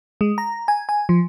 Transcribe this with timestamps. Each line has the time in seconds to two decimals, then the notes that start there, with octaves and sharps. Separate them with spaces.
0.21 G#3
0.38 A#5
0.68 G#5
0.89 G#5
1.09 F3